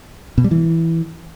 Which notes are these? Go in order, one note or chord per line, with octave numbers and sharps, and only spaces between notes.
B2
G3
E3